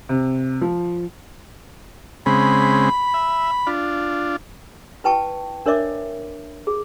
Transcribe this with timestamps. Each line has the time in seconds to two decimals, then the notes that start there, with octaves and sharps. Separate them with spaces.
0.09 C3
0.61 F3
2.26 C#3 G#3 C4 B5
3.14 E5
3.67 D4 F4
5.04 E4 B4 G5 A5 C#6
5.66 D4 A#4 C#5 D5 E5 D6
6.67 G#4